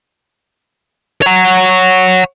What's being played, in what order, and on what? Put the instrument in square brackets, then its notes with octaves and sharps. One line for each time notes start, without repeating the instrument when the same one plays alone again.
[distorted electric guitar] C#5 F#5